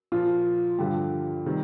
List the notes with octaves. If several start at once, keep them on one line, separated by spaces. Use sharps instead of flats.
A#2 F3 F4
G2 D3 F3 G4
C3 D#3 G3